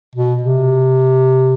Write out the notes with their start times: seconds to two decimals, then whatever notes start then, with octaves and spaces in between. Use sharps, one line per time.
0.15 B2
0.43 C3